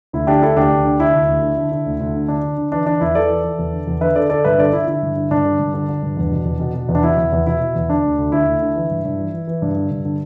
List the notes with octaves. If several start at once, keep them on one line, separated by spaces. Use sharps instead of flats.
D2 E4
D3 D4 G4
D3 E4 A4
D2 D4 G4
D2
D3
D3 E4
D2
D2
D3
D3
D3
D2
D2
D3
D3 D4
D3
D3
E3 D4
E3 D4
E2 E4
E3 A4 D5
E3
E3
E2
D3
E2
D3 B4 E5
D3 A4 D5
D3 A4 D5
G2 B4 E5
D3 A4 D5
D3 E4
D3 E4
G2
D3
G2 D4
D3
G2
D3
D3
G2
E2
B2
E2
B2
B2
E2
D4
B2 E4
E2
E2
B2 E4
B2
E2
D3 D4
D2
D2
D3 E4
D2
D3
E3
G2
G2
E3
E3
E3
G2
D3
G2
D3